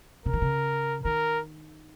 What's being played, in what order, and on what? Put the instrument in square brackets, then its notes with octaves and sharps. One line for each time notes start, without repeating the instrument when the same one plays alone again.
[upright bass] C#3 [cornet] A#4
[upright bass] D#3
C#3
[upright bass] D#3 [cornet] A#4